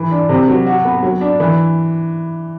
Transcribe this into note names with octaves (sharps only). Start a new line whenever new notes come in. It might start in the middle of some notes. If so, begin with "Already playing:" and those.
Already playing: E3
D4
C3
F#3
F#4
B3
F#3
D4
E3